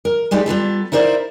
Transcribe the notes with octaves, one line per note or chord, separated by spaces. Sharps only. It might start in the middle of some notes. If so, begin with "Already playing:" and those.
A#4
E3 G#3 D#4 G4 D5
G3 B3 F4 A4
D#4 E4 A#4 C5 D5